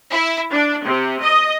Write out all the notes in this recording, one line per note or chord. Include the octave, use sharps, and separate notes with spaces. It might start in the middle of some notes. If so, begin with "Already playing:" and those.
E4
D4
C3
D#5